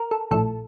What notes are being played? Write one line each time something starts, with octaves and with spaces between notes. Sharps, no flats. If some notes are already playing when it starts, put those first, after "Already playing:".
Already playing: A#4
A4
A#1 A2 A4